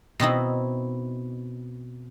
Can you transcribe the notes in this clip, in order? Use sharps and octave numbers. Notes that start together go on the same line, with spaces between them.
B2 C4 D#4 E4